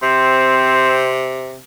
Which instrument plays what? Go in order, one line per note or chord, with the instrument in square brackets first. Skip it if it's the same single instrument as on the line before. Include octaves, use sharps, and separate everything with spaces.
[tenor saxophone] C3 [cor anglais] C4